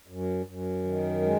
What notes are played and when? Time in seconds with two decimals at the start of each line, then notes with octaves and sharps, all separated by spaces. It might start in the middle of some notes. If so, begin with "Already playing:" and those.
0.08 F#2
0.46 F#2
0.84 D#3
1.22 G#3